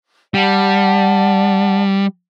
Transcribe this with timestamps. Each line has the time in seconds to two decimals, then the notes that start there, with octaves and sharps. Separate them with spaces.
0.34 G3 D5 F#5 A5